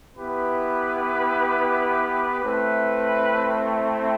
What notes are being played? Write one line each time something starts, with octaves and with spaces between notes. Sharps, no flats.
B3 E4 G4 B4
A3 C4 E4 B4